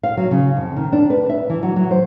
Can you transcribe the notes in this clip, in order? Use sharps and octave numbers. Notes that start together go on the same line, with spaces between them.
F5
F#3
C#3
F2
D#3
D4
B4
E5
E3
F#3
F#3
C5